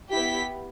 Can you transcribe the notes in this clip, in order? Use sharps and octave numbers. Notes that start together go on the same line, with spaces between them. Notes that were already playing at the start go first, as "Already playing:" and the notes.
B3 E4 G4 B6